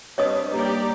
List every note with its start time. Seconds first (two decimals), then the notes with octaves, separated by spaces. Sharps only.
0.18 G3 C4 D4 B4 C#5 D#5 D#6
0.54 G3 A#3 D#4 G4 D5 A#5